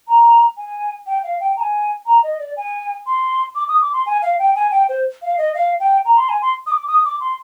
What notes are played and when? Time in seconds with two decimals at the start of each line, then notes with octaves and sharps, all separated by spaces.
0.08 A#5
0.57 G#5
1.07 G5
1.23 F5
1.40 G5
1.57 A#5
1.60 G#5
2.06 A#5
2.23 D#5
2.39 D5
2.57 G#5
3.06 C6
3.55 D6
3.68 D#6
3.81 D6
3.93 C6
4.06 G#5
4.22 F5
4.39 G5
4.56 G#5
4.71 G5
4.89 C5
5.22 F5
5.38 D#5
5.54 F5
5.80 G5
6.05 A#5
6.17 C6
6.29 G#5
6.42 C6
6.66 D#6
6.71 D6
6.87 D#6
7.05 D6
7.20 C6